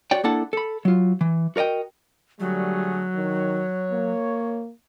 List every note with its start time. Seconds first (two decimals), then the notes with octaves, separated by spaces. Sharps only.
0.11 F#4 C#5 D5 G5
0.24 A#3 D4 E4 A4 F#5 A5
0.53 A4 B5
0.85 F#3 F4
1.21 E3
1.56 F#4 A#4 D5 D#5 G5
2.40 D3 F#3 G3 A3 G#4
3.15 D#3 C#5
3.91 A#3